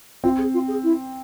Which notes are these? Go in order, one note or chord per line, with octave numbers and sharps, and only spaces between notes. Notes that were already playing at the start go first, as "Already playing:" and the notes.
C4 F4
G#4
F4
G#4
E4